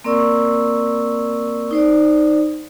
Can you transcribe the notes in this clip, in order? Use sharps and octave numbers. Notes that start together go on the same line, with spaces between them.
A#3 C4 A#4 D5 C#6 E6
D#4 C5 D5